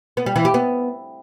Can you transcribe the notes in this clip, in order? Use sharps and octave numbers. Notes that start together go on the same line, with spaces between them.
B3
G3
E3
G4
B3